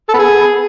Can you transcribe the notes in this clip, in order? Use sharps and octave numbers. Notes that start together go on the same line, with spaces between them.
A4
B3
G#4